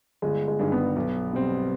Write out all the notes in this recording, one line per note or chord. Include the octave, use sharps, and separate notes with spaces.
G1 G#3
G#3
G2 D#3 G#3
B3
B1
B2 G3 C4